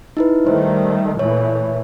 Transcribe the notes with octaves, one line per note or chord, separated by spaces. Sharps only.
D#4 E4 B4
D#3 G3 A3 C5
A#2 E3 A3 C#5